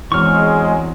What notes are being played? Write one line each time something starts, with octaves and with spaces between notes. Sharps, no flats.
E2 F#3 G#3 C4 C#6 F6